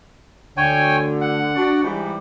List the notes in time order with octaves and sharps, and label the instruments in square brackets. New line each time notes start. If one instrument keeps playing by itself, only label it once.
[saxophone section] D2 D3 [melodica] C#5 G5 G#5
[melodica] F#5
[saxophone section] D4 F#4
G#2 E3 G3